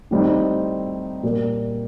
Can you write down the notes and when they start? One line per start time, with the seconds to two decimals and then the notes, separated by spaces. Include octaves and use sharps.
0.11 A2 G3 C4 D#4
1.23 A#2 G3 A#3